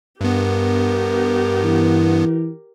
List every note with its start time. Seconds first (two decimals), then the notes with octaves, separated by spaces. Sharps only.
0.21 G2 B3 G4 A#4
1.64 E3